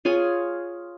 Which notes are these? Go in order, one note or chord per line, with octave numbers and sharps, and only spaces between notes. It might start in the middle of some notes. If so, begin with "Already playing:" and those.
F4 G#4 C#5 G#5